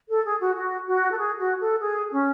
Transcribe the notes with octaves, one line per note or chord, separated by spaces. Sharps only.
A4
G#4
F#4
F#4
F#4
A4
G#4
F#4
A4
G#4
C#4